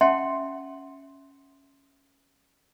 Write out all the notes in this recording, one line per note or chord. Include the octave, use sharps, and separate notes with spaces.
C#4 E5 F#5 G5 A5 C6